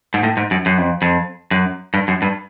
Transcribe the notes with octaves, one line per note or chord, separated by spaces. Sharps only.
G#2
A2
G#2
F#2
F#2
F2
F2
F#2
G2
F#2
G2